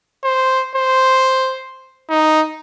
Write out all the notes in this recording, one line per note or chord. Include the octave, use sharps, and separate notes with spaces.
C5
C5
D#4